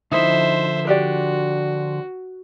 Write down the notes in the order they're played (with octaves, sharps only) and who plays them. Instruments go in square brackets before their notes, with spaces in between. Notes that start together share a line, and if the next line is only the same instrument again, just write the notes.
[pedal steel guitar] D3 F3 [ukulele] D#4 E4 [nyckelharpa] C5 E5
[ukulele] D4 G4 D5 [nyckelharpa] F#4